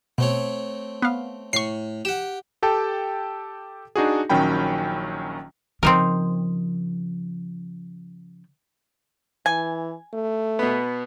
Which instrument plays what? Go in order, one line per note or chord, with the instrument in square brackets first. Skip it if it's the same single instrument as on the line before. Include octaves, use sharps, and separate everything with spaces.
[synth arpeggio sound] B2 [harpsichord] A3 C4 C#5
[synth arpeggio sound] B3 F5
[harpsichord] A2 [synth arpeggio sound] C#6 C7
[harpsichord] G4 F#5 [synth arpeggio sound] E7
[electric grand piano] G4 A4 G5 A5
D4 D#4 F#4 G#4
A#1 D#3 F#3 C#4 G5 B5
[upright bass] C#3 F3 [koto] C4 D#4 A#4
[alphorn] E3 [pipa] G#5
[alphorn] A3
[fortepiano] B2 B3